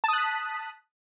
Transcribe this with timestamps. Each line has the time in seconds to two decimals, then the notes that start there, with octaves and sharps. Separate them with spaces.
0.04 A5
0.08 D#6
0.13 F#6
0.18 B6